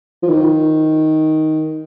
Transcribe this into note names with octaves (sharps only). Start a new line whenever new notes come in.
F3
D#3